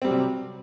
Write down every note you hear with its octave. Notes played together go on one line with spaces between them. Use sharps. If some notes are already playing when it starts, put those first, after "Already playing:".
C3 F#3 G3 C4